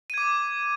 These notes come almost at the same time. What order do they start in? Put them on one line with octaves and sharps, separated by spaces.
D#7 G#6 D6